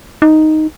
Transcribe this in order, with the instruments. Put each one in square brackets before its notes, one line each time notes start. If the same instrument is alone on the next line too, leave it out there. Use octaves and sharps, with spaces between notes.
[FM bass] D#4